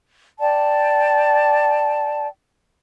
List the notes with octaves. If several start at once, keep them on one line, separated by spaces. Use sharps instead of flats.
D5 G5 A5